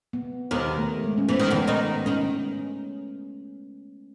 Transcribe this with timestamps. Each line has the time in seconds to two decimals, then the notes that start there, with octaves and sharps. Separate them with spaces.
0.13 B3
0.51 D#2 D#3 B3
0.78 A3
1.04 G#3
1.18 C#4
1.29 E3 B3
1.40 D#3
1.50 E2 E3
1.68 D#3 D#4
2.06 D#3 C#4 D#4